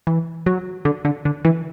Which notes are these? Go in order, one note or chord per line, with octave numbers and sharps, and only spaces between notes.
E3
F#3
D3
D3
D3
E3